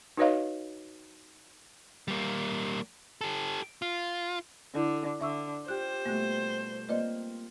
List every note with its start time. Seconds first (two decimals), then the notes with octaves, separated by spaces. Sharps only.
0.17 D#4 F#4 B4 C#5 D#5 F5
2.08 G3 A#3
3.21 G4 A4
3.82 F4
4.75 D3 E4 A4
5.21 D3 E5 C#6 E6
5.68 F4 G4 C5 F#6
6.05 B2 G3 A3 A#3 F#6
6.89 A#3 C4 F4 B4 D5 D#5